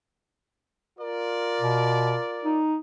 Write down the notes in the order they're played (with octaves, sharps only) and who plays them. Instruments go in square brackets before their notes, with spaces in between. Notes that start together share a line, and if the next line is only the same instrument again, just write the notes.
[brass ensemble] F4 A#4 D5
[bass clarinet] B2
D#4